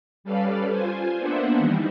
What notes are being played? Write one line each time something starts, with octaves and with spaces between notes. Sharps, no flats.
G3 C#4 A4 B4 D5 F5
F4 C5 G#5
A#3 B3 D4 C5 E5 F#5
D#3 E3 G3 D#4